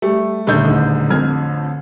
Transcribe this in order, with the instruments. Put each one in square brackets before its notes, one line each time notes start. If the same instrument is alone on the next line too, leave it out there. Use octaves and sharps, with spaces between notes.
[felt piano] G3 [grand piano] A3
[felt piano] D#1 D#4 G6 [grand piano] D3 A3
[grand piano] A1 D3 G#4
[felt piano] F2 F6 G#6